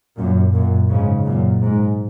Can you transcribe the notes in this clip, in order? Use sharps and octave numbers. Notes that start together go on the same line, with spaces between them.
F#2 A#2
F#2 A#2
G#2 C#3
F#2 A#2
G#2